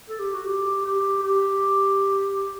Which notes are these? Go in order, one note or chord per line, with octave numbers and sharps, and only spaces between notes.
A4
G4
F#4
G4
G4
G4